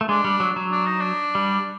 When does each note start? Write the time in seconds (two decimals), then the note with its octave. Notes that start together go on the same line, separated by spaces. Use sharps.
0.01 A3
0.09 G#3 D4
0.24 G3
0.40 F#3
0.56 F#3
0.72 D4
0.86 D#4
1.00 D4
1.35 G3